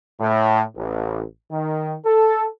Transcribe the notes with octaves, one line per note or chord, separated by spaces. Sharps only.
A2
A1
D#3
A4